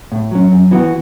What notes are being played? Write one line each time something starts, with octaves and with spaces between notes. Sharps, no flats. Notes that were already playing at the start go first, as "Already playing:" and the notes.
A2
F#3 C#4
F#2
E3 B3 F#4